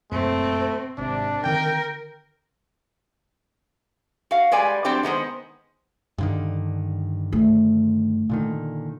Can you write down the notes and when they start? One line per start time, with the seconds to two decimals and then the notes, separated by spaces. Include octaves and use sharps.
0.12 F1 F#2 A#2 A3 C4
0.98 G#1 C3 D4
1.44 D3 D#3 C4 A#4 G5
4.31 F#4 F5
4.52 G3 G#3 B4 D5 G#5
4.85 F#3 G3 C4 D4 G4 C5
5.03 D#3 G#3 B3 C5
6.18 G2 D3 D#3
7.33 A3
8.30 A#2 D3 D#3